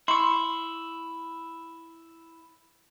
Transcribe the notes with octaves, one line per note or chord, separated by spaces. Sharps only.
E4 C6 C#6